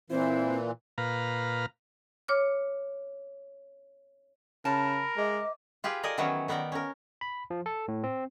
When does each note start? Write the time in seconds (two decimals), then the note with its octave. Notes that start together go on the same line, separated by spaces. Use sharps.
0.10 A#2 E3 C4 E4 C5
0.98 A#2 B4 F5 A#5
2.28 C#5 D6 F6
4.65 C#3 A#4 A5 B5
5.17 G#3 D#5 E5 D6
5.84 F4 G4 G#4 B4 F5
6.03 A4 A#4 D5 D#5 G#5
6.18 D#3 E3 F#3 B3 C#4
6.48 D#3 B3 A#4 D5 G5
6.72 C#4 A#4
7.21 B5
7.50 F3
7.66 A4
7.88 A2
8.04 C4